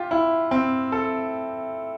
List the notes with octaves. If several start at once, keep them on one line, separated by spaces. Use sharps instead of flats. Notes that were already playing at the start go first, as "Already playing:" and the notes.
Already playing: F4 G4
E4
C4
A4